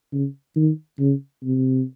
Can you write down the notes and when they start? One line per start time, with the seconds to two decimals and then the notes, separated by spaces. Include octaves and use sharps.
0.13 C#3
0.56 D#3
1.00 C#3
1.43 C3